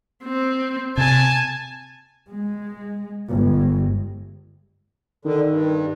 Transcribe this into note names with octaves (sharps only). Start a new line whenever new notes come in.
C4
C3 G#5 A5
G#3
G1 G#3
D3 D#3
G2